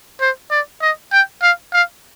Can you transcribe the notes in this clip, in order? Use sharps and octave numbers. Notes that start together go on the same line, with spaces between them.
C5
D5
D#5
G5
F5
F5